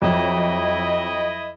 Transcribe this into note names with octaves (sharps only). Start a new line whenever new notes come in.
F2 F#3 E4 D#5